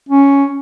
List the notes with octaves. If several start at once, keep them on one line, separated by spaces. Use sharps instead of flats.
C#4